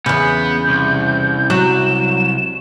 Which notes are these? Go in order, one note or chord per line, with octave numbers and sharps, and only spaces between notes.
E2 C#3 B3 G6
C2
F#3 E7